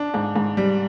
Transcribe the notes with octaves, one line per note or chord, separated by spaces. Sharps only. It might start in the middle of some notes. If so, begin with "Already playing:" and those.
Already playing: D4
G#2
G#2
G3